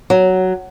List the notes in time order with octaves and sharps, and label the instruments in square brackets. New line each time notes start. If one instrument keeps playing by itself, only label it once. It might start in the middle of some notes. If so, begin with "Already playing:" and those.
[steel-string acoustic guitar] F#3